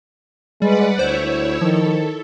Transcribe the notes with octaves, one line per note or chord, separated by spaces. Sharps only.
G3 G#3 B4 D5 F#5
D2 E4 C5 C#5 E5
D#3 F3 A4